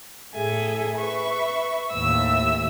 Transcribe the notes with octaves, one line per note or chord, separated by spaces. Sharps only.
A2 G#4 A4 E5 G#5
B4 E5 C#6
D#2 A2 E5 E6